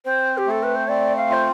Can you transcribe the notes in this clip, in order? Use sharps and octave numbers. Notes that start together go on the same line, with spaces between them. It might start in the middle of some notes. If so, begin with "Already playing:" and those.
C4 C5
G4
A3 A4
B4
C5
C4 D5
F5
F4 C5